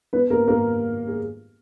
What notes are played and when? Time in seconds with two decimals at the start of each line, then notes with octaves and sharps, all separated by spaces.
0.13 B3 B4
0.30 A#3 A#4
0.48 A#3 A#4
1.08 G#4